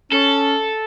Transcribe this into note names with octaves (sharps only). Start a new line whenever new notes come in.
C#4 A4